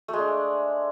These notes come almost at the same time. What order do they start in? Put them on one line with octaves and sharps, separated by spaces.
A3 G#3 D4